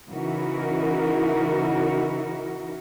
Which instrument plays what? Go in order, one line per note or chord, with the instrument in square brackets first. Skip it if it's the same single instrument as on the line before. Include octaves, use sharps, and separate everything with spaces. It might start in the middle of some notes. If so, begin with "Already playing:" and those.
[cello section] C#3 E3 D#4 E4 F#4 A#4